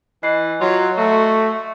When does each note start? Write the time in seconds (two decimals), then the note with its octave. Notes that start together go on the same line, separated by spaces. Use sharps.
0.23 E3 D#5 F#6 C7
0.61 F#3 F4
0.98 A3 F#4